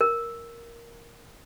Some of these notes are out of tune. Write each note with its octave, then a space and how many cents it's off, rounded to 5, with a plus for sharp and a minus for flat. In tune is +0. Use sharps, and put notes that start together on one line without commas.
A#4 +5